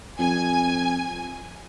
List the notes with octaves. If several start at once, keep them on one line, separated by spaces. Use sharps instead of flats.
F2 G#5